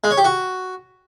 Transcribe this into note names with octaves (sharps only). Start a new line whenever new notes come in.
G#3
C#5
G4
F#4